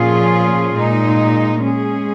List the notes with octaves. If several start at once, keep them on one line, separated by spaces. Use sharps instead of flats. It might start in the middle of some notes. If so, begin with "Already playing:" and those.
Already playing: A#2 F3 C#4 F4 G#4
A#2 G#3 D#4
G#3 C#4 G#4